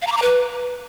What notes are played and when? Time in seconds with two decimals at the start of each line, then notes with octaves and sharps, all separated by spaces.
0.02 F5
0.07 A#5
0.12 D6
0.17 A#5
0.22 B4